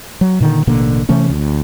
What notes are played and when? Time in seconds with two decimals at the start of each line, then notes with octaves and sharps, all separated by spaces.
0.21 F#3
0.40 A#2 D3 D#3
0.67 A1 B2 D3 A#3
1.09 C3 E3 A3 C#4
1.30 D2